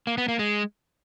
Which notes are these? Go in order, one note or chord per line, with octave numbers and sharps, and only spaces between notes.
A#3
B3
A#3
G#3